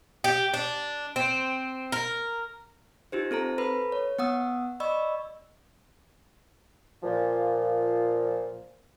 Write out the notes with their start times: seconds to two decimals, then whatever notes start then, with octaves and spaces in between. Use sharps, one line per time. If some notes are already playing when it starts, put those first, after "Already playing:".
0.24 G4
0.54 D4
1.16 C4
1.92 A#4
3.12 D#4 F4 G4 C5
3.31 C4 A4 C5 A#5
3.58 A4 B4 B5
3.92 C#5
4.19 B3 F#5 D#6 E6
4.80 D5 D#5 B5 C#6 E6
7.02 A#2 F3